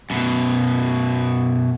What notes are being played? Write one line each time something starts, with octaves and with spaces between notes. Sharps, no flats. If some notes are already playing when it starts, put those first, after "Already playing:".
F#2 B2